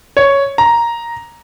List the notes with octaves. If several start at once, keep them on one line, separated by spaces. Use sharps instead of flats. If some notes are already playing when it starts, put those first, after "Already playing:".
C#5
A#5